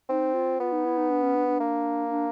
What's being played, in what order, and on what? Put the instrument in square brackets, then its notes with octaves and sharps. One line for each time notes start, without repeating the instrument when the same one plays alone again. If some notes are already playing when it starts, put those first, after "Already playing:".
[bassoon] C4 [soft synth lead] D#4
[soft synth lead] F4
[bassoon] B3 [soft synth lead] F4
[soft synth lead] D#4
E4
D#4
D4
C#4
D4
D4
[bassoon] A#3
[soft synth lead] D4